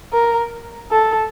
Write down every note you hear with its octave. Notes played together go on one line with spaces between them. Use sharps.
A#4
A4